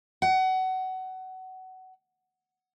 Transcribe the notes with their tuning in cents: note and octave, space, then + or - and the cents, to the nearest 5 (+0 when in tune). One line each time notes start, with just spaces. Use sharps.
F#5 +20